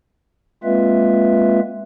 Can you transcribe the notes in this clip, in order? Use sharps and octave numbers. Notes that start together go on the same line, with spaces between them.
G#3 A#3 C4 F4 B4 E5